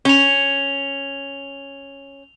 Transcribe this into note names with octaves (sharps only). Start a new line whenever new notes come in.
C#4 F7 G7